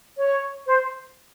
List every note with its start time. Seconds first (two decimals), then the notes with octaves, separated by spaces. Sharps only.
0.17 C#5
0.66 C5